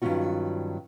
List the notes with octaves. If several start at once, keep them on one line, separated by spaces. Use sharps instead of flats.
G2 D#3 F#3 C#4 F4 F#4